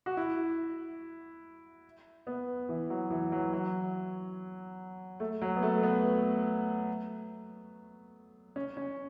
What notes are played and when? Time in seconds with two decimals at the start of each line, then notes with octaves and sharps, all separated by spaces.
0.06 F#4
0.17 E4
2.27 B3
2.69 E3
2.90 F#3
3.11 E3
3.32 F#3
3.53 F#3
5.20 A3
5.41 F#3
5.57 B3
5.63 A3
5.83 B3
8.56 C#4
8.77 C#4